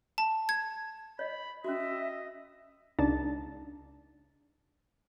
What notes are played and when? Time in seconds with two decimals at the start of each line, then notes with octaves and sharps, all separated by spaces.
0.18 A5
0.49 G#6
1.19 C#5 D#5 B5
1.64 C#4 F#4 D#5 E5
2.99 C#2 D4 D#4 A5 A6